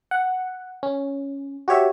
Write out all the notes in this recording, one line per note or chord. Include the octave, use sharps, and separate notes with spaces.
F#5
C#4
F#4 G4 C#5 E5